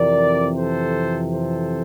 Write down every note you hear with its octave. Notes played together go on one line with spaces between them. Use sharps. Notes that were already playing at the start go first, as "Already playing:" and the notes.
Already playing: F2 C3 E3 A#4 D5
A4 C5
A4 C5